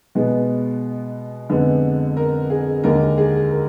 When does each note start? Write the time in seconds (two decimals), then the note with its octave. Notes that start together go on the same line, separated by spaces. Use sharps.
0.15 B2 G#3 B3
1.49 F2 D3 G#3 B3
2.17 A#4
2.50 G#4
2.83 D#2 D3 G#3 A#4
3.18 G#4
3.51 A#4